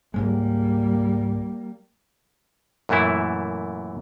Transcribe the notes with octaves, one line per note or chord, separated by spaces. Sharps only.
C#2 G#2 G3 G#3 A#3
F#2 A#2 E3 A3 E4